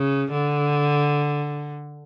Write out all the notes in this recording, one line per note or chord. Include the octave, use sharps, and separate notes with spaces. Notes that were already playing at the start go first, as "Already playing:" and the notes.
Already playing: C#3
D3